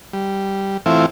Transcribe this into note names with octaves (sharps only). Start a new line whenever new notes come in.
G3
E3 A3 C4 E4 F4